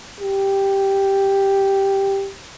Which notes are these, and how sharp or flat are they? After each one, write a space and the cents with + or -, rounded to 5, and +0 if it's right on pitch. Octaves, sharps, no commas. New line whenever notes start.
G4 +0